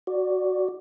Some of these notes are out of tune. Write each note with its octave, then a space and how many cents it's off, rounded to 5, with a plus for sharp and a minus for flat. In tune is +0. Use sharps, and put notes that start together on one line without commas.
F#4 +0 D5 +0